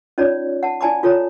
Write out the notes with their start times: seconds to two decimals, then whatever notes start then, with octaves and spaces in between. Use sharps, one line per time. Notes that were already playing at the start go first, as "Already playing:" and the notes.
0.18 C#4 D#4 F4 C#5 D5
0.63 F#5 A5
0.81 E4 D5 G#5 A5 B5 D6
1.03 F4 A4 C#5 A#5